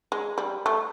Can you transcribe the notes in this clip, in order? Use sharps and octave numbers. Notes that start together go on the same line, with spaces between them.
G#3
G3
A3